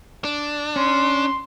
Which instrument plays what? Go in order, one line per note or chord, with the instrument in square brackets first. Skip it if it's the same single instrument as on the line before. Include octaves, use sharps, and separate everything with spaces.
[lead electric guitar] D4
[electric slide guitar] C#4 [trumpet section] C6